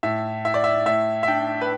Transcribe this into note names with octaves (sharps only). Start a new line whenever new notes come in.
A2 E5
E4 E5
D5
E5
A2 E5
E5
D4 G5
B4